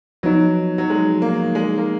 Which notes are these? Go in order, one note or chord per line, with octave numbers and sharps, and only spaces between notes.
F3 F#3 B3 D#4
F#3
G#3
A#3
G#3
A#3